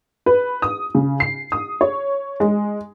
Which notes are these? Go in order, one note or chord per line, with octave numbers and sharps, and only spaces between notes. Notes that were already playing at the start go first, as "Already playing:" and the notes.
B4
D#6
C#3
C7
D#6
C#5
G#3